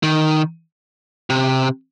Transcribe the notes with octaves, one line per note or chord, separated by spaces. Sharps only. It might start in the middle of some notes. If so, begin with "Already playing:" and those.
D#3
C3